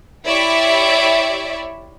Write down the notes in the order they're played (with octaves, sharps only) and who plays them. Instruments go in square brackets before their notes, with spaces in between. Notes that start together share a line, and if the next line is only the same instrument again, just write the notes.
[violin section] E4 G4 C#5 D5 E5